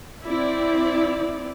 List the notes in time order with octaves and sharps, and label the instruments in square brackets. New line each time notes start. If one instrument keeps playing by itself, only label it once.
[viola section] C4 E4 D5